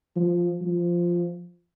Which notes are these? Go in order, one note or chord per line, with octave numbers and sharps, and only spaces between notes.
F3
F3